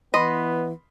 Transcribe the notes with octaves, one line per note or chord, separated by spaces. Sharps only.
E3 B3 D#5 B5 C6